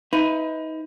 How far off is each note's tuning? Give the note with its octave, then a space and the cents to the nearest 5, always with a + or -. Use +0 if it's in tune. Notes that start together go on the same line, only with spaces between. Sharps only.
D#4 +30 B4 +15 E5 +20